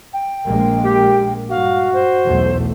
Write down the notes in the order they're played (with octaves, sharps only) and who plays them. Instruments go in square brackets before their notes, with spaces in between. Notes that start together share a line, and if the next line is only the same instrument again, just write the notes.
[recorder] G5
[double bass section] A#1 G#3 A#3
[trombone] G4
[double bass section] G2 [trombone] F#4 [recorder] F5
[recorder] C5
[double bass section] B1 E2 A3